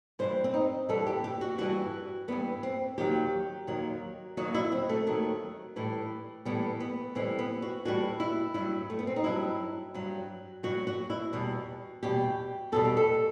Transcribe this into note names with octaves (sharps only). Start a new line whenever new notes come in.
G2 E3 G3 C5
C4
D#4
G2 E3 G3 A4
G4
G4
F#4
G2 E3 G3 F#4
G2 E3 G3 B3
C4
D#2 D#3 F#3 G4
D#2 D#3 F#3
D#2 D#3 F#3 F#4
E4
C4
A3
D#2 D#3 F#3
A2 E3 G3
A2 E3 G3 B3
B3
A2 E3 G3 C4
B3
F#4
A2 E3 G3 F#4
E4
G2 F#3 E4
A3
B3
C4
D#4
G2 F#3 E4
G2 F#3
G2 F#3 F#4
F#4
E4
E2 B2 G3
E2 B2 G3 G4
E2 B2 G3 A4
G4
A4